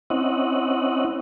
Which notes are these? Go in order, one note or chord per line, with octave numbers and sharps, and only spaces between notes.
C4 C#4 E4 D#5 F#5